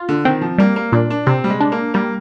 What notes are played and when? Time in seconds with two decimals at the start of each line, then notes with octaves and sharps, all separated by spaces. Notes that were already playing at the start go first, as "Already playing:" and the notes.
Already playing: F4
0.09 D3
0.25 D#3 C4
0.41 F3
0.58 G3 A#3
0.76 A#3
0.92 A#2 D4
1.10 D4
1.26 C3 C4
1.44 G3
1.50 G#3
1.60 D4
1.72 A#3
1.94 G3 A#3